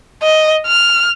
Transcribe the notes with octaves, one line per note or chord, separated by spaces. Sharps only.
D#5
F6